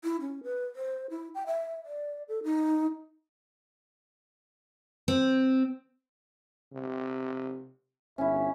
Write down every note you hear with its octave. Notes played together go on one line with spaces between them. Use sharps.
E4
C#4
B4
C5
E4
G5
E5
D5
A4
D#4
C4
C3
G1 C#4 E4 E5